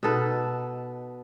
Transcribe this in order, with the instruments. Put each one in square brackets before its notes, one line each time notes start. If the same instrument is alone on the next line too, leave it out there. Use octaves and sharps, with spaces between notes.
[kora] B2 D#4 A4 B4